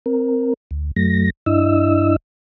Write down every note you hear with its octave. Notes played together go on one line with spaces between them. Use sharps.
C4 A#4
D2
F#2 F#3 A3 A#6
G2 D4 E4 D#5 E6